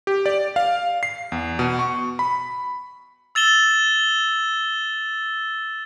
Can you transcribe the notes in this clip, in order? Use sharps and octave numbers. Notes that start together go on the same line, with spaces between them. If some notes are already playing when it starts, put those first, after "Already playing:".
G4
D5
F5
C7
E2
B2
C#6
B5
E6 A6 E7 G7